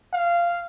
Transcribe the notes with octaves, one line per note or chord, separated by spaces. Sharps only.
F5